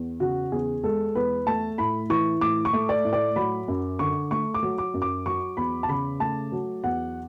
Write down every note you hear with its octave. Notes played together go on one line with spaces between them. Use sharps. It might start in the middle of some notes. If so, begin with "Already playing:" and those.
Already playing: E2
C#3 F#4
E2 G#4
G#3 A4
E2 B4
A3 A5
A2 B5
E3 C#6
A2 D6
C#6
A3
D5
A2
D5
F#3 B5
F#2
D3 C#6
A3 C#6
D6
F#3
D6
F#2
D6
F#3 C#6
E2 B5
A5
C#3 B5
A3 A5
F#3
E2 F#5